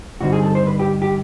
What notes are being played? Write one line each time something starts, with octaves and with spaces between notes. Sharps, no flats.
G2 D3 G3 C4 D#4 F#4
G#4
A4
C5
B4
G4
G4